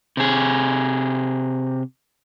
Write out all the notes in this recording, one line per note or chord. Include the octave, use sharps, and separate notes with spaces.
C3 G#4